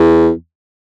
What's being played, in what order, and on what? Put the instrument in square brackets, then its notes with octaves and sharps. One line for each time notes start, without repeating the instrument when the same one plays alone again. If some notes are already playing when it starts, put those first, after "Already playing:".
Already playing: [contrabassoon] E2